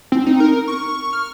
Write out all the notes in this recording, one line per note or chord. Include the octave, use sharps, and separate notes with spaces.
C4
D#4
A#4
C#6
F6